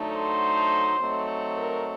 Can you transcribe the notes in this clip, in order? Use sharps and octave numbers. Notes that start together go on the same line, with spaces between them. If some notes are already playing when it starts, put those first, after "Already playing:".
Already playing: D3 F#3 A3 D#4
C5
F#3 A3 C4 D#4
A#4